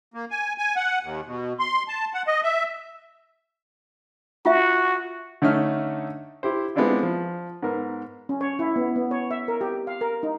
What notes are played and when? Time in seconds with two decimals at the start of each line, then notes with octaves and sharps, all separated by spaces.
0.14 A#3
0.31 G#5
0.58 G#5
0.76 F#5
1.03 D#2
1.26 B2
1.59 C6
1.88 A5
2.14 F#5
2.27 D#5
2.43 E5
4.45 F4 F#4 E5
5.42 D3 A3 C#4 D#4 E5 F6
6.43 E4 G4 C5
6.76 G#3 B3 C4 D4 E4 F4
7.03 F3
7.63 G#2 B3 A#4
8.29 C#4
8.41 C#5
8.59 E4
8.76 B3
8.96 B3
9.11 C#5
9.31 E5
9.48 A#4
9.61 G4
9.87 F5
10.01 A#4
10.23 D#4